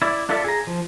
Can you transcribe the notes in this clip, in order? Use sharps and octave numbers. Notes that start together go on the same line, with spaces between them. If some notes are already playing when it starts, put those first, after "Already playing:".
E4 D5
D4 F4 A4 D5 E5
G#4 A#5
F3